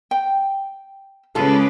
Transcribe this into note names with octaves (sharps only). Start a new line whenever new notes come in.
G5
C#3 G#3 C#4 F4 A4 B4 D6